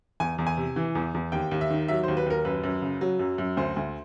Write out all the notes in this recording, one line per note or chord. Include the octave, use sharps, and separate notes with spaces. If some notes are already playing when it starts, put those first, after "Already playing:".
E2 G#5
E2
G#5
C3
E3
E2
E2
D#2 G5
D#2
E5
D#3
F#3 E5
D#2 C5
B4
D#2 A#4
F#2 B4
F#2
C#3
F#3
F#2
F#2
D2 C5
D2